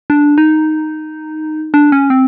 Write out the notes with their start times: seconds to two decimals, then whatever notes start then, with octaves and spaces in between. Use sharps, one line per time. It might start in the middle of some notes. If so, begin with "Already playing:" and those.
0.10 D4
0.38 D#4
1.74 D4
1.92 C#4
2.10 C4